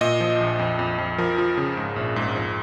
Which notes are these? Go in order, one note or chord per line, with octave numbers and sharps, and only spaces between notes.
A#2 D#5
F3
A#1
F2
F2
F2
F3 A#4
F3
C#3
G#2
A#1
G#2
F2